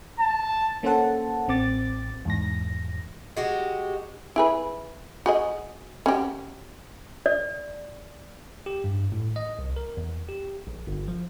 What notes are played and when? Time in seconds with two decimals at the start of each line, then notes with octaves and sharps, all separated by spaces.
0.19 A5
0.83 A#3 C#4 A4 C5 F#5 A5
1.48 A1 C4 D6 A6
2.25 E2 G#2 A#6
3.36 G#3 F#4 G4
4.36 E4 G#4 B4
5.26 F#4 G#4 D#5
6.06 C#4 F#4 G4
7.26 D5
8.66 G4
8.84 G2
9.12 A2
9.36 D#5
9.59 C2
9.76 A#4
9.97 E2
10.29 G4
10.67 A#1
10.87 G1
11.08 F3